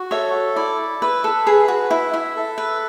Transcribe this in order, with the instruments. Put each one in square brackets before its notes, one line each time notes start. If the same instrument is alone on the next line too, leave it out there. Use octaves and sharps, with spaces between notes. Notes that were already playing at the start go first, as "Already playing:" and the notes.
Already playing: [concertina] F#4
[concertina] A4 [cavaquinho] C#5 E5
[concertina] E4 [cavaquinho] D5
[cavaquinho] B4 [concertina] E5
[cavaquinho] A4
[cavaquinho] G#4 [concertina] B4
[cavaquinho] F#4
[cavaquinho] E4 [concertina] E5
[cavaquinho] E4
[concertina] A4
[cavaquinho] B4